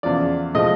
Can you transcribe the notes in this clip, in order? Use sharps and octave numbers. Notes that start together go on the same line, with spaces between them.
E2 C#3 F3 D5
A2 F3 G#3 D#5